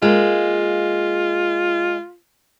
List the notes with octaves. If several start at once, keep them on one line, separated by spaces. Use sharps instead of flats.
G#3 A#3 F4